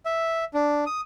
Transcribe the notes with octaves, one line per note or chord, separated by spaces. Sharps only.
E5
D4
D#6